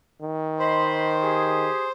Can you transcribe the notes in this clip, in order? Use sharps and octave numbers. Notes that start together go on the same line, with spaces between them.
D#3
C5 D#5 B5 C6
G4 G#4